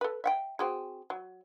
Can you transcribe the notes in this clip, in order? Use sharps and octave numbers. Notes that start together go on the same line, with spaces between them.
A4 B4
E5 F#5 G5
C4 F#4 G#4
F#3